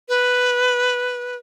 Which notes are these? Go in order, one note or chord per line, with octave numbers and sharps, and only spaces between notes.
B4